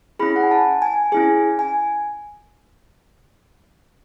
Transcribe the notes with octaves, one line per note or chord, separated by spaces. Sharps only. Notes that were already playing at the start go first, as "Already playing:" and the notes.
C#4 E4 G#4 B5
F#5
G#5
A5
G#5
C#4 E4 G#4 G#5
G#5